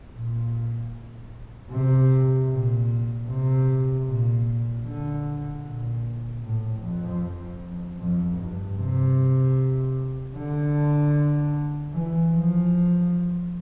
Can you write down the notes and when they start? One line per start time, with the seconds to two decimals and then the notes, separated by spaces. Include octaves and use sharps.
0.13 A#2
1.70 C3
2.49 A#2
3.28 C3
4.06 A#2
4.85 D3
5.63 A#2
6.42 A2
6.81 F2
7.21 F2
7.99 F2
8.38 G2
8.78 C3
10.35 D3
11.92 E3
12.32 F3